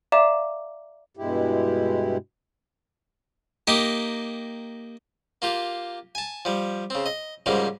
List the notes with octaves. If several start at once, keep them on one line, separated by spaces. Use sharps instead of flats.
D5 E5 F5 A#5 D6 E7
G2 B2 G#3 E4 G4
A#3 D#4 G4
A#3 F4 G4
G#5 A5
F3 G3
C#3 C4
D#5
G#2 C#3 F3 G3 A#3